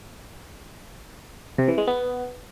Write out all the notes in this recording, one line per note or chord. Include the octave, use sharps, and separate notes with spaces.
C3
E3
G#3
B3